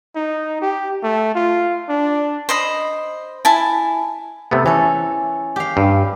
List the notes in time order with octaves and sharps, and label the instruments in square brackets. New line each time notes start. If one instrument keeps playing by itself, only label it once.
[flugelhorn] D#4
G4
A3
F4
D4
[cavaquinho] C5 D#5 B5
E4 G#5 A5
[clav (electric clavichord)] C3 A3 B3
[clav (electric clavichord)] E3 [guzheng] C#4 A4
[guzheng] G4 F5
[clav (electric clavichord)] G2